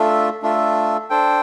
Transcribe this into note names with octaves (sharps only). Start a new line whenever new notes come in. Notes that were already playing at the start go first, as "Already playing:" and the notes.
Already playing: A3 D4 F4 A4 E5
A3 D4 F4 A4 E5
D4 A4 C5 G5